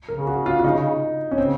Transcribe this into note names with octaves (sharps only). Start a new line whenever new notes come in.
C#3 A#4
G#4
F#4
F4
F4
D#4
C#4
C#3 C4